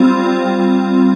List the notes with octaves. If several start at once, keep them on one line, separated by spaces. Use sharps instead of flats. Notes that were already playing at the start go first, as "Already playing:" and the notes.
Already playing: G3 C4 F4